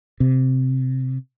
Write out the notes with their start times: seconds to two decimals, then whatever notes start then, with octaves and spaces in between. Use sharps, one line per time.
0.20 C3